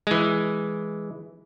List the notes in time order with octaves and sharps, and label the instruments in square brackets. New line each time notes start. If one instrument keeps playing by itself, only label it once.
[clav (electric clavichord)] E3 G#3